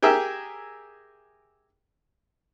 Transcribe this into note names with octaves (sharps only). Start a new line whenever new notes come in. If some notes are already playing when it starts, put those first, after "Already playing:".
G4 G#4 A#4 E5